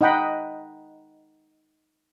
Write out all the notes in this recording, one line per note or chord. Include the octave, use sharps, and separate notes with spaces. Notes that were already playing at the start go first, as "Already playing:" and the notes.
D#4 D#5 F#5 G5 B5